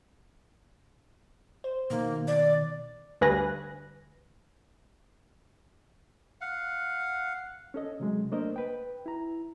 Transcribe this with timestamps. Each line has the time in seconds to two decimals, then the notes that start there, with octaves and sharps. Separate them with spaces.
1.64 C5
1.90 B2 D#3 A#3
2.28 D5
3.21 D2 G2 B4 G#5 F#6 A#6
6.41 F5 F#5
7.74 C#4 A4 D#5
8.00 C3 F#3 G#3
8.32 A3 A#3 D4 A#4 C5 D#5
8.56 B4 G5
9.06 E4 A#5